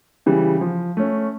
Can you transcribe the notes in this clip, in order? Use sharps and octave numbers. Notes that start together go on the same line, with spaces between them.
C#3 E3 G3
F3
A3 C#4